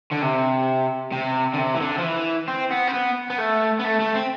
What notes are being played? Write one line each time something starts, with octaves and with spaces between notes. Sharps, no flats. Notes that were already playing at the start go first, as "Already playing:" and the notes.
D3
C3
C3
D3
C3
E3
D3
F3
E3
C4
B3
C4
B3
B3
A3
B3
A3
A3
C4